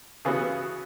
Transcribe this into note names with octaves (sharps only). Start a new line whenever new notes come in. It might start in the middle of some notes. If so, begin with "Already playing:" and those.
C#3 E3 B3 F#4